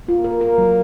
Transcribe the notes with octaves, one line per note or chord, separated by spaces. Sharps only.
A#3 F4
A#4
A#4
F#3